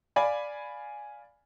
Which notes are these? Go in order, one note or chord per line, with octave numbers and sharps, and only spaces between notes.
D5 F5 G#5 B5